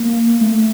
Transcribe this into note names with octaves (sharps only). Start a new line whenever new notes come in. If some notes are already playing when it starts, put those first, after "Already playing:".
Already playing: A#3
A3